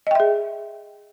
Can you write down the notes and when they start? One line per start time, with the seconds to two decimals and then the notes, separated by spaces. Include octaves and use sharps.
0.07 D#5
0.11 G5
0.15 E5
0.20 G#4